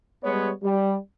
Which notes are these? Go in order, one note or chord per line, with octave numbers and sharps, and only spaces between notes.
G3 G#3 B3 C#5
G3